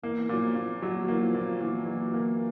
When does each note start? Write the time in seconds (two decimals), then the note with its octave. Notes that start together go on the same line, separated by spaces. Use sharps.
0.03 E3 A#3
0.29 A#2 F#3
0.42 F3
0.55 A#2
0.82 F#3
1.08 E3 A#3
1.21 F3
1.34 A#2
1.60 A#2 E3
1.86 F#3
2.14 A#3